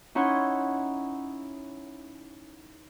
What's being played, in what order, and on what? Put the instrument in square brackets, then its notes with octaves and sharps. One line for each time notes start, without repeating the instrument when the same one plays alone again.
[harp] C#4 D#4 E4 C#5 F#5 C6